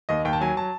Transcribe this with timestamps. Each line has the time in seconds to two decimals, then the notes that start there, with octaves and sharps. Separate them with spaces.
0.09 D#2 D#5
0.25 D#2 G5
0.33 A5
0.41 F#3 G#5
0.57 F#3 A5